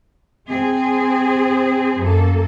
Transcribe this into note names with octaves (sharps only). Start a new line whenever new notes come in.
C4 G#4 C5
F#2 A#3 A4